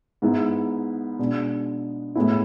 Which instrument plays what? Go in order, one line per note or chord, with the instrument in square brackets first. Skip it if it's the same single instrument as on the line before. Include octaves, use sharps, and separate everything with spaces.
[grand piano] G#2 G#3 B3 E4
B2 G#3 D4
A2 G#3 B3 E4